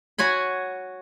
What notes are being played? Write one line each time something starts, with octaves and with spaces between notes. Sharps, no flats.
F#4 C#5 G#5 B5